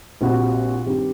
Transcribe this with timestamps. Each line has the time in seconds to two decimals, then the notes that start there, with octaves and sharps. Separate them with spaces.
0.21 A#1 A#2 G3 C4 F#4
0.86 G2 D#3 G3 C4 G4